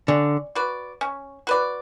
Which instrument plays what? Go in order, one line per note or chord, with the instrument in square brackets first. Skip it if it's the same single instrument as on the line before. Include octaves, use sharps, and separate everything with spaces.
[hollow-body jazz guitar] D3 [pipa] C#4
[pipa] F#4 B4 D5
C#4
F#4 B4 D5